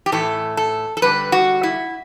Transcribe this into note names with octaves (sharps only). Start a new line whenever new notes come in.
G4
A2 E3 A3 A4
A4
A4
D3 G3 B4
F#4
E4